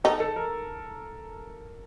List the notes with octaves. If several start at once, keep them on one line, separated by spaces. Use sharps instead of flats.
D#4 A4
A4
A#4